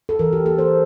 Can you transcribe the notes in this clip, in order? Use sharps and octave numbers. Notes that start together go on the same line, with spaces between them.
A4
E3 A#4
G4
A#3 A4
C5